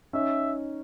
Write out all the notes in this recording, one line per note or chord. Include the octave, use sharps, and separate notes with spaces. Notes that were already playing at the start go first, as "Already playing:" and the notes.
C#4 D#4 E5